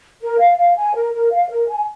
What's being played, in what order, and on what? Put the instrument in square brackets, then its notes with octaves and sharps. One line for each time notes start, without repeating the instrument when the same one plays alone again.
[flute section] A#4
F5
F5
G#5
A#4
A#4
F5
A#4
G#5